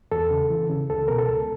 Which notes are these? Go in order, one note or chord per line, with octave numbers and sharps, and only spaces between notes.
E2 A4
C#3
E3
C#3
C#2 A4
B2 A#4
A4
C#2